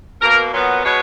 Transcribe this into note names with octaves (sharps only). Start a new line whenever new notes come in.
B2 A#3 A#4
A#2 F#3 B3
B2 G#3 B3 C#5